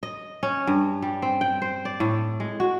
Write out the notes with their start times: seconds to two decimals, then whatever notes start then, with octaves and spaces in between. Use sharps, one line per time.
0.03 D#5
0.43 C#4
0.67 G2
1.02 G3
1.22 C4
1.41 G5
1.62 C5
1.85 D5
2.00 A2
2.40 G#3
2.60 F#4